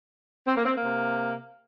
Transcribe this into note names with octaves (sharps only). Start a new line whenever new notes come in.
C4
A#3
C4
A#3
C3